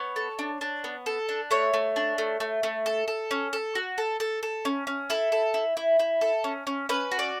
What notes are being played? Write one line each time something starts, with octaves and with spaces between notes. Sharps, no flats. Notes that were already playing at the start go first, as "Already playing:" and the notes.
Already playing: B3 C#5
A4
D4
D4
B3
A4
D4
A3 C#5
A3
D4
A3
A3
A3
A4
A4
C#4
A4
F#4
A4
A4
A4
C#4
C#4
E4 A4
A4
E4
E4
E4
A4
C#4
C#4
C#4 B4
F#4
D5